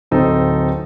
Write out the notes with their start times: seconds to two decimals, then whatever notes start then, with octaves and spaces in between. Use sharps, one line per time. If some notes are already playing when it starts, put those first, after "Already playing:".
0.11 D1 C4 D#4 A4 A5